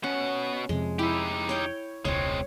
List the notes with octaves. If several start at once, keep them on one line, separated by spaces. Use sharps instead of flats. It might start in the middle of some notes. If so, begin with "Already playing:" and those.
B2 C#4 F#5
F2 C3 G#3
D#4 E4 G4 B5
C#5 G5
E1 C#2 G#3 C4 C#5